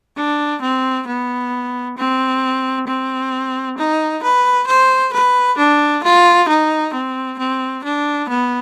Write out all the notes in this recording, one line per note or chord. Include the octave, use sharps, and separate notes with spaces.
D4
C4
B3
C4
C4
D#4
B4
C5
B4
D4
F4
D#4
C4
C4
D4
B3